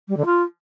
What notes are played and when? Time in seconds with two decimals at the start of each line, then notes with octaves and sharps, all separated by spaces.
0.08 G3
0.17 D3
0.25 F4